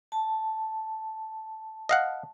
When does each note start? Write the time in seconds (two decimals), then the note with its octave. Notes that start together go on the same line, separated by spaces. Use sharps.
0.12 A5
1.89 D#5 F5 F#5